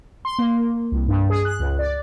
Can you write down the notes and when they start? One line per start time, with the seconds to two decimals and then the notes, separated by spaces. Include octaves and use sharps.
0.25 C6
0.39 A#3
0.92 C2
1.08 G2
1.30 G#4
1.45 F#6
1.59 C#2
1.79 D5